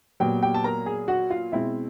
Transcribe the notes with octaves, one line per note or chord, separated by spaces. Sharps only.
A#2 F#3 B3 G4 G5
G4 G5
A5
A#4 A#5
G#4 G#5
F#4 F#5
F4 F5
B2 G#3 C4 E4 E5